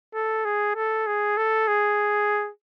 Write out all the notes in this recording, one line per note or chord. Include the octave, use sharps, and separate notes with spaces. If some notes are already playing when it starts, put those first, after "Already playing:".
A4
G#4
A4
G#4
A4
G#4